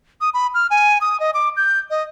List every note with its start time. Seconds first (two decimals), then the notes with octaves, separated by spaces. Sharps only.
0.21 D#6
0.34 B5
0.54 F6
0.70 G#5
1.01 D#6
1.20 D#5
1.34 D6
1.57 G6
1.90 D#5